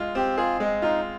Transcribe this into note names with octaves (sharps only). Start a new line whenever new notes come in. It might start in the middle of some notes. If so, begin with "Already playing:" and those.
Already playing: G#3 F4
C4 G4
F4 G#4
G#3
D#4 F4